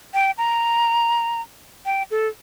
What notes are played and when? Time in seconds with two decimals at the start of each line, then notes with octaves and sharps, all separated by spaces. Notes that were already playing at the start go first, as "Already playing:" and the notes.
0.14 G5
0.38 A#5
1.86 G5
2.11 A4